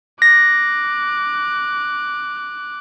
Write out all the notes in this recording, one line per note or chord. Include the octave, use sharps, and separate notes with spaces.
D6 F#6 A#6